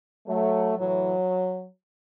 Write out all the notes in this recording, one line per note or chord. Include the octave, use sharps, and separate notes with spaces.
F#3 A3
A2 E3 F#3